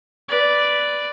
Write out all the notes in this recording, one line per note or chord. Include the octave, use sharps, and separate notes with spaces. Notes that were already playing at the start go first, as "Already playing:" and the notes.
B4 D5